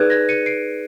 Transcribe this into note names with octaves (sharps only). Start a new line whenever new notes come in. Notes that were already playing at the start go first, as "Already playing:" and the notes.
Already playing: D#4 G#4 B4 D5 F#6 G#6
G#6 A#6
C#7 D#7
C7 D7